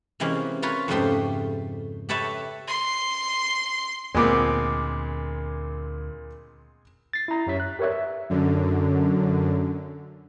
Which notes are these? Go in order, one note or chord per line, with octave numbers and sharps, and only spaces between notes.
C3 E3 G#3 A#3 C#4
F4 A#4 B4 C#5
F2 G#2 C#3 A3 G4 C6
G4 A4 B4 C#5 E5 A5
C6
D2 A#2 G#3 B3 C4 D6
A6 C7
E4 A#5
F#2 G4 C#5 E5 B6
F#6
G4 A#4 B4 C#5 D5 E5
E5
F#2 D3